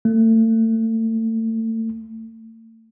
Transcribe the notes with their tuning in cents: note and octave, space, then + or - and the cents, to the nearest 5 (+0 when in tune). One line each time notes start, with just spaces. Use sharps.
A3 +35